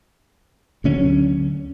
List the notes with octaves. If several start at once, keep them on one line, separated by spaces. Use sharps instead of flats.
D2 D3 F#3 C#4